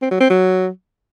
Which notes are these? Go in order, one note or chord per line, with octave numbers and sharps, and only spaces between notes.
C4
F#3
C4
F#3